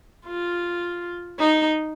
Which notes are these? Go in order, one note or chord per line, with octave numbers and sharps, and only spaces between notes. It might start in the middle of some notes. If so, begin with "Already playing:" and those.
F4
D#4